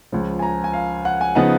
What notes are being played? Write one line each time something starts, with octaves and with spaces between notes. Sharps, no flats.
C#2 C#3 F3
G#5
A#5
G#5
F5
F#5
G#5
C#3 F3 B3 D#4 F#5